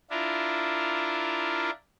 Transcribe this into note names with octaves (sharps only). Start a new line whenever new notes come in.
D4 E4 F4 A#4